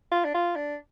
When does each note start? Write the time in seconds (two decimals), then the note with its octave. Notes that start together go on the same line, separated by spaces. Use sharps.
0.12 F4
0.25 D4
0.34 F4
0.56 D4